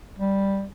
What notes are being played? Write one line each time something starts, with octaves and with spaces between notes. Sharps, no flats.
G3